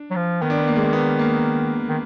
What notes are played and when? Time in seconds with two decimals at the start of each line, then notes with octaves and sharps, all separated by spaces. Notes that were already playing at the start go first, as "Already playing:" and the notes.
Already playing: D4
0.10 F#3
0.16 F3
0.42 D#3 B3
0.50 D4
0.58 B3
0.67 A#3
0.76 G#3
0.83 A#3
0.93 B3
1.19 A#3
1.88 D#3